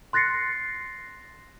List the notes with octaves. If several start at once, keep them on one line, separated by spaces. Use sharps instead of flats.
C6 F#6 A6 A#6 C7 C#7